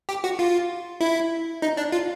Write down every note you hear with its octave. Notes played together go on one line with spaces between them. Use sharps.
G4
F#4
F4
E4
D#4
D4
F4